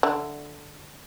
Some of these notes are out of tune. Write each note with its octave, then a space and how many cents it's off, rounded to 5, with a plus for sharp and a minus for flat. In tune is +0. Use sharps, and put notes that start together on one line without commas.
D3 +0 D4 +10 E5 +0